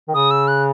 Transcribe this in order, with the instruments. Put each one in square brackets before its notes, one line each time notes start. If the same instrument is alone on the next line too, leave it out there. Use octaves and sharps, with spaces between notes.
[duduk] D#3
[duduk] C#3 [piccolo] D#6
[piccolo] E6
F#6